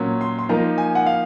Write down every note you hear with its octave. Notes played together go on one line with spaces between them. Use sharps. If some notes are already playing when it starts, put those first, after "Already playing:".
Already playing: A#2 F#3 C#4
C6
C6
F3 A#3 D#4 A#5
G#5
F#5
F5